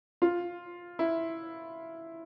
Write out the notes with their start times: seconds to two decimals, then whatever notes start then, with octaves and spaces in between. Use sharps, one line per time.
0.22 F4
0.99 E4